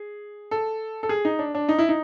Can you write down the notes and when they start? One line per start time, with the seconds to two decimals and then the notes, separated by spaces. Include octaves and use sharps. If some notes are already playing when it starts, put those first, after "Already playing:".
Already playing: G#4
0.51 A4
1.03 A4
1.09 G#4
1.25 D#4
1.39 D4
1.55 D4
1.69 D#4
1.78 E4
1.89 D#4